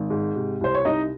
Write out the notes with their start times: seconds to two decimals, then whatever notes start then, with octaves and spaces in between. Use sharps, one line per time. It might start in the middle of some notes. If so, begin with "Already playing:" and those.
Already playing: G#1
0.10 G#2
0.35 C3
0.61 C2 C5
0.75 C#5
0.85 C2 D#4 D#5